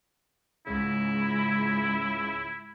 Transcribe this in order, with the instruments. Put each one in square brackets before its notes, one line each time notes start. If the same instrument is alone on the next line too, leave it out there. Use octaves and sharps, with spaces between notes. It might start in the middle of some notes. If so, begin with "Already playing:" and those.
[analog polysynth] C#2 C#3 [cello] G#2 G#3 [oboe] E4